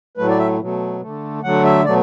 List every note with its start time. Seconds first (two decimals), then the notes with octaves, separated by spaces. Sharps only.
0.17 A2 F#3 A3 B4
0.29 D5
0.38 E5
0.60 B2 F#3 A3
1.01 D3 A3
1.43 D3 F#3 A3 F#5
1.64 E5
1.85 B2 F#3 A3 D5